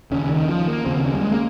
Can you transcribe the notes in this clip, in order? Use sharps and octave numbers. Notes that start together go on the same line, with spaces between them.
D#2 C#3 C#4
D#3
F3
A#3
D#2 C#3 C4
C#4
G3
G#3
A#3